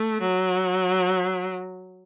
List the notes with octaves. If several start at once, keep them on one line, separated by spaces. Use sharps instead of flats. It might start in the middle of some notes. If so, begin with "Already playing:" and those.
Already playing: A3
F#3